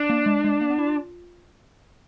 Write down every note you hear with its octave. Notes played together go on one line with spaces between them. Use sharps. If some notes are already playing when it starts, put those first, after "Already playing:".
Already playing: D4
A#3
G#3
G#3
A#3
B3
E4
F4